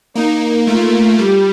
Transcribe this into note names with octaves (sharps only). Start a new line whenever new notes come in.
A#3 D#4
A3 F4
G3 G4